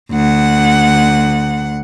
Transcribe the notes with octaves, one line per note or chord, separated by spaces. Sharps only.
D2 F#5